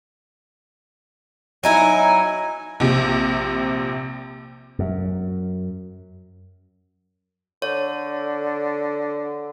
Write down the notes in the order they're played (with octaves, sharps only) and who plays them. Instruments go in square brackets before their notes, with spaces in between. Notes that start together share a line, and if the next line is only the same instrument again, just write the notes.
[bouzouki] F#3 D#4 E4 [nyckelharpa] G#5
[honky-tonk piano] A#1 C3
[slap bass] F#2
[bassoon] D3 [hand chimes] C#5